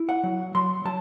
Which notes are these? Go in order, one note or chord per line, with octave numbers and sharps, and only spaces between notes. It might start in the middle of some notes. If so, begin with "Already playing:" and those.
Already playing: E4
F#5
F#3
F#3 C6
F#3 A5